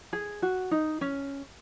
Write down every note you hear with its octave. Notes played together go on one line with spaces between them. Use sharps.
G#4
F#4
D#4
C#4